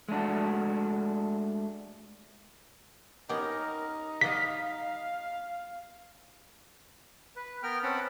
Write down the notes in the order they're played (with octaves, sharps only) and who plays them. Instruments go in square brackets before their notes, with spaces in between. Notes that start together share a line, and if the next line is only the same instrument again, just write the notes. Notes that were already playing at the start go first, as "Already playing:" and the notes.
[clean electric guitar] G#3 A3 D4 F#4
[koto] B3 C#4 G4 [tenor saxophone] D#4 [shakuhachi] A#4
[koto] G3 B3 D#5 [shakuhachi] F5 [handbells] B6
[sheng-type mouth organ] B4
B3 A#4 G5 F6
C4 C#4 F#5 A5 B5